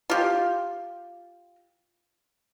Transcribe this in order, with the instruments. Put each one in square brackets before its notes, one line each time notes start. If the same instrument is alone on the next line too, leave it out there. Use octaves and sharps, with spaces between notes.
[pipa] F4 G4